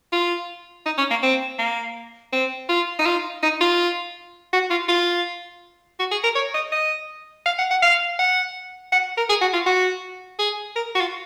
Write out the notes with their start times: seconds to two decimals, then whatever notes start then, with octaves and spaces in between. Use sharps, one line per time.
0.12 F4
0.86 D#4
0.98 C#4
1.10 A#3
1.23 C4
1.58 A#3
2.32 C4
2.69 F4
2.99 D#4
3.05 F4
3.43 D#4
3.60 F4
4.53 F#4
4.70 F4
4.88 F4
5.99 F#4
6.11 G#4
6.24 A#4
6.35 C#5
6.54 D#5
6.72 D#5
7.46 F5
7.58 F#5
7.70 F#5
7.82 F5
8.19 F#5
8.92 F#5
9.17 A#4
9.29 G#4
9.41 F#4
9.53 F4
9.66 F#4
10.39 G#4
10.76 A#4
10.95 F#4
11.00 F4